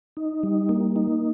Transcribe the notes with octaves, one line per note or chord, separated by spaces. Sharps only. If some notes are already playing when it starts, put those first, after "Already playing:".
D#4
G3
A#3
D#4